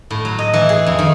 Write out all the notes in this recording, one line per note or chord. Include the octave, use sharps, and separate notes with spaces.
A2
F#3
D#5
E3
G#4
F2
D#3